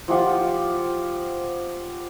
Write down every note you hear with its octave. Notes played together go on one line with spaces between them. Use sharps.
F3 F4 G4 F#5